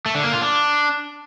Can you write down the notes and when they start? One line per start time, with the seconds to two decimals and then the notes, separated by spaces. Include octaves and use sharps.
0.06 A3
0.15 D3
0.24 A#3
0.33 F4
0.42 D4